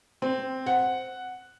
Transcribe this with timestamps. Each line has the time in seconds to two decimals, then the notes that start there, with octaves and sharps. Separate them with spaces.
0.22 C4
0.66 F#5